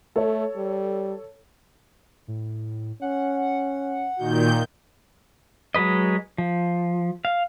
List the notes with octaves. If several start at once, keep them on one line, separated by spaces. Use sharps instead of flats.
A3 A4 C#5
G3
A2
C#4 F#5
A#2 D#3 F#4 G6
F#3 G#3 B4 D#5
F3
F5